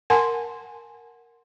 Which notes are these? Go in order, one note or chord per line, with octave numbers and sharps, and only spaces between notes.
A#4 F#5 G#5 A5 C6